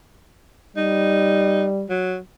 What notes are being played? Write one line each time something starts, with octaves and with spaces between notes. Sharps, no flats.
G3 D#4
F#3